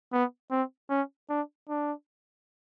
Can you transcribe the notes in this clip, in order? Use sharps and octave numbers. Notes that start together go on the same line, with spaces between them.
B3
C4
C#4
D4
D4